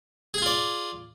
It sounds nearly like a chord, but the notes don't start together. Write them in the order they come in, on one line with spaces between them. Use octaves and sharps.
G#4 G#5 F4 D5